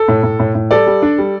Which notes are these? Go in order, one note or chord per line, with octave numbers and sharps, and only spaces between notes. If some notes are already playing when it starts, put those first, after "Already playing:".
Already playing: A4
A2
A2
A2
A2
G3 A4 D5
G3
D4
G3